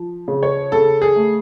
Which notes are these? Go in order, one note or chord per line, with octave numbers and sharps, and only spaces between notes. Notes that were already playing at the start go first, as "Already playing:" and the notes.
Already playing: F3
C#3
C#5
C#3 A4
G#4
A3